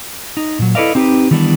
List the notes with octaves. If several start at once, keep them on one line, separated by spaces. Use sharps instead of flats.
D#4
A#2 F#3
E4 A4 B4 D5 D#5 F5
C4 D#4 G4 A#4 B4
D#3 E3 G3 B3 D4